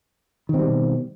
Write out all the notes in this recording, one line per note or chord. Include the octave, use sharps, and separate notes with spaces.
B2 D#3 G3 C4